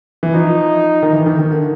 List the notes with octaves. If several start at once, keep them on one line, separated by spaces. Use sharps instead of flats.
E3
F3 D#4
D#3
E3
D#3
D#3
D3